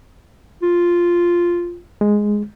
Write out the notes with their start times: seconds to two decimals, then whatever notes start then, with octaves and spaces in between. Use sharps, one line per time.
0.62 F4
2.01 G#3